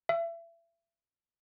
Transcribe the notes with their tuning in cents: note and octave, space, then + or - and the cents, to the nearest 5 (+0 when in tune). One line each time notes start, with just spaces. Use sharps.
E5 +30